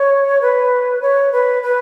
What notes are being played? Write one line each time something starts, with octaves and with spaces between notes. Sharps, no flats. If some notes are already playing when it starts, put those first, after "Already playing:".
Already playing: C#5
B4
C#5
B4
B4